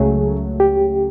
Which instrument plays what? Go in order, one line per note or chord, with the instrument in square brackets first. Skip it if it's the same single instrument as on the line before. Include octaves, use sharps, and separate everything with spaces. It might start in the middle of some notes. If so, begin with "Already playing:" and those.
Already playing: [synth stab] C#2 C#3 F#3 A3 [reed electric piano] G#4
[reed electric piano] G4